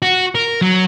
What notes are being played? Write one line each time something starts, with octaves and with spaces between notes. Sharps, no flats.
F#4
A#4
F#3